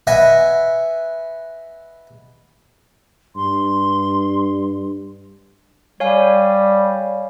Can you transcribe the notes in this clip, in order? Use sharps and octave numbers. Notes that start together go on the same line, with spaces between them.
B4 D#5 E5 F#5 G#5
G2 C6
G3 C#5 F5 G#5